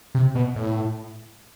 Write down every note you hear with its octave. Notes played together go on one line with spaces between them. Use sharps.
C3
B2
A2